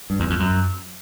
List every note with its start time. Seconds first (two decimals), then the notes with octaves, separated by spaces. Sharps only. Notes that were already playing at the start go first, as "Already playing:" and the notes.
0.10 G2
0.20 E2
0.30 F2
0.40 F#2